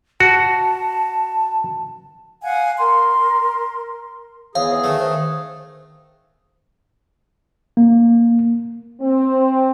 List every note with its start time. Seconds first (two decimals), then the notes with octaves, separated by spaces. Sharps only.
0.20 F#4 A5
2.43 F5 F#5 G#5
2.78 A#4 C6
4.55 E2 G#4 C#5 F5
4.71 B4 E5 F#5
4.84 D#3 A3
4.98 C5 E5
7.77 A#3
9.01 C4